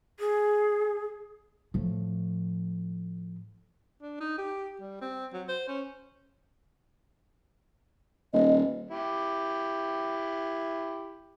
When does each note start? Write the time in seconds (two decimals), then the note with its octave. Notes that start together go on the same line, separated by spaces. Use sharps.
0.20 G#4
1.74 A2 F3
4.01 D4
4.20 D#4
4.38 G4
4.81 G3
5.01 C4
5.34 F#3
5.48 C5
5.68 C#4
8.33 D#1 D#5
8.91 E4 G4